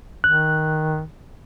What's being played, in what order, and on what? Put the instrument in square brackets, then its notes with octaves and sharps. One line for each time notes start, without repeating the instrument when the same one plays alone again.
[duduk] D#3 [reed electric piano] F#6